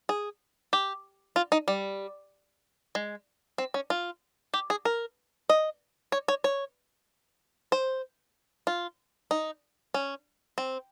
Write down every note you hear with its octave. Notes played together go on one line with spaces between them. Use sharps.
G#4
G4
F4
D#4
G3
G#3
C4
C#4
F4
G4
G#4
A#4
D#5
C#5
C#5
C#5
C5
F4
D#4
C#4
C4